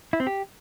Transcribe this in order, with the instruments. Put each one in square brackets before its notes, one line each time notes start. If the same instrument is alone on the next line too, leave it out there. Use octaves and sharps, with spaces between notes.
[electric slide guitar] E4
C4
G4